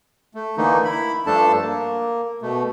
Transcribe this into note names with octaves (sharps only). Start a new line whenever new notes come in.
A3
D3 E3 A3 A#3 D#4
E4 B5
G2 F3 A3 D4 A4 A5
A#3
B2 A3